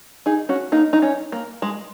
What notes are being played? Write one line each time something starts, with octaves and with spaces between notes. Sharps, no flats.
D#4 G#4
C#4 F#4
A#3 D#4
D#4
C#4
A#3
G#3